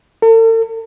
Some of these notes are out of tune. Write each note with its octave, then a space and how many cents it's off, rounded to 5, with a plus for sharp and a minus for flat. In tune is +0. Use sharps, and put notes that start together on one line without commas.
A4 +45